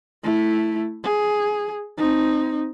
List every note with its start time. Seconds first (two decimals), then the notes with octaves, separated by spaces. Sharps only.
0.23 A3 E4
1.04 G#4
1.98 C4 D#4